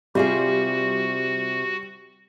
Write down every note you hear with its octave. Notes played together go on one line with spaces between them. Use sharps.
C3 G3 F4 F#4 G#4